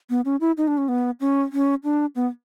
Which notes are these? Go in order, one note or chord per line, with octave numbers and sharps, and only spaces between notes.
B3
C#4
E4
D#4
D4
C#4
B3
C#4
C#4
D4
B3